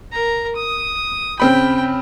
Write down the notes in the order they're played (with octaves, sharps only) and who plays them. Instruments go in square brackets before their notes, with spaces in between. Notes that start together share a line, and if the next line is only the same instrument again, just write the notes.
[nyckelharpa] A#4 A#5
D#6
[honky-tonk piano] C#3 C4 B5 [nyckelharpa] G5